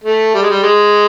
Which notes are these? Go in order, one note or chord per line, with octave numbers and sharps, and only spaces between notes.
A3
G3
G#3
G3
G#3